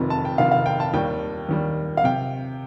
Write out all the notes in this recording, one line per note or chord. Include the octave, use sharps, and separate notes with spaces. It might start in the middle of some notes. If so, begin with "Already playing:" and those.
Already playing: F1 F2 C3 D#3
A5
G5
F1 F2 C3 D#3 F5
F5
G5
A5
D#2 D#3 G3 G5
D#2 D#3 G3
F5
C3 G5